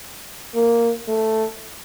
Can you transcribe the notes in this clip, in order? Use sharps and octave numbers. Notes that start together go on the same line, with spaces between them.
A#3
A3